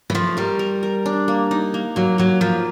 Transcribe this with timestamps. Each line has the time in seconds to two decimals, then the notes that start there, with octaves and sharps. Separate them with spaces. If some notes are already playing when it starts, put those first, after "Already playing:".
0.10 E3
0.14 F3 A3
0.37 G3 A#4
0.59 A#4
0.83 A#4
1.06 D4
1.28 A#3
1.51 D#4
1.74 A#3
1.96 F#3 A#3
2.18 F#3 A#3
2.41 F3 A#3